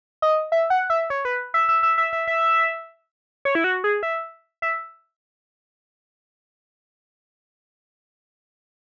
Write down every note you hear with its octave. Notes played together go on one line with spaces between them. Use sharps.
D#5
E5
F#5
E5
C#5
B4
E5
E5
E5
E5
E5
E5
C#5
E4
F#4
G#4
E5
E5